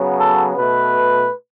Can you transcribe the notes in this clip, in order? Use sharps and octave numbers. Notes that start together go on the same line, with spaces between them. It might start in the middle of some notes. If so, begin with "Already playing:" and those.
Already playing: C#3 F#3 B3
A4
B2 A3 B4